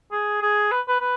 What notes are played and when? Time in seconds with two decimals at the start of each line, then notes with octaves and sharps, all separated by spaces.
0.11 G#4
0.42 G#4
0.71 B4
0.88 B4
1.00 B4